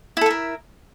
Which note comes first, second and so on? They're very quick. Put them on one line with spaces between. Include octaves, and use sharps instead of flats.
E4 A4 E5 A#4